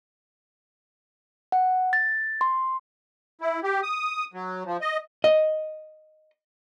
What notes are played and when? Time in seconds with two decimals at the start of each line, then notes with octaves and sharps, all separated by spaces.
1.52 F#5
1.93 A6
2.41 C6
3.41 E4
3.64 G4
3.83 D#6
4.34 F#3
4.65 F3
4.81 D#5
5.24 D#5